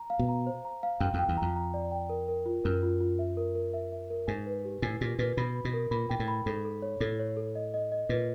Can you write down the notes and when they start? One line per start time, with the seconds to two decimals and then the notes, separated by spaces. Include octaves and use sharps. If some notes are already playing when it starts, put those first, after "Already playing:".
Already playing: A#5
0.10 F5
0.19 B2
0.29 A#5
0.47 C5
0.65 A#5
0.83 F5
1.00 F#2 G5
1.14 F2
1.19 G5
1.29 E2
1.37 F2 A#5
1.56 A#5
1.74 D5
1.92 G5
2.09 A#4
2.28 A#4
2.46 F4
2.64 F#2 A#4
2.83 F4
3.01 F4
3.19 E5
3.37 A#4
3.55 A#4
3.74 E5
3.92 E5
4.10 A#4
4.27 G#2 G#5
4.47 B4
4.65 G4
4.82 A2 G#5
5.01 A#2 G4
5.19 A#2 B4
5.37 B2 B5
5.56 B5
5.65 B2
5.74 A#4
5.91 A#2 B5
6.09 A#2 G5
6.20 A2
6.28 B5
6.46 G#2 A4
6.65 A4
6.82 C#5
7.00 A2 A4
7.19 C#5
7.37 A4
7.55 D#5
7.74 D#5
7.92 D#5
8.09 A#2 B4